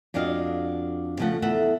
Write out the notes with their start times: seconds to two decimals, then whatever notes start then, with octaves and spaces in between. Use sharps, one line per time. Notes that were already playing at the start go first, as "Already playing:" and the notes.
0.14 F2 D4 F#4 D#5 F5
1.19 C#3 F3 A3 F#5
1.42 E2 A4 E5 F#5